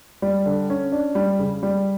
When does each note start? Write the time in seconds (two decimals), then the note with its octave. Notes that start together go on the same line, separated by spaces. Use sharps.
0.22 G3
0.46 D3
0.70 C#4
0.92 D4
1.15 G3
1.39 C#3
1.63 G3